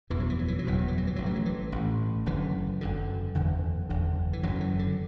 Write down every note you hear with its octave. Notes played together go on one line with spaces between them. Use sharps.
F#1 E2 B2 E3
F#3
E3
F#3
E3
F#3
F#1 E2 B2 E3
F#3
E3
F#3
E3
A1 A2 F#3
E3
F#3
E3
A1 A2
F#1 F#2 D3 E3
F#1 F#2 D3
F#1 E2 D3
F#1 E2 D3
E3
F#1 F#2 D3 F#3
E3
D3